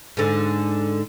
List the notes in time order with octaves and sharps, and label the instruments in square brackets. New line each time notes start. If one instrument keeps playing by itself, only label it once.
[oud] G#2 D3